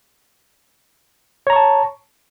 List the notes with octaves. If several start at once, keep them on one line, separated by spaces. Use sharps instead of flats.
C#5 A5 A#5 C#6